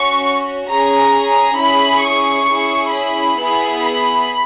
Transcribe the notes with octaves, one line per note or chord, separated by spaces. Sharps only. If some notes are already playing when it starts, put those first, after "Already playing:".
Already playing: C#4 F#4 C#6
C#4 G#4 A#5
C#4 E4 G#4 B5
C#6
C#4 E4 G#4
B5
B3 E4 G#4
B5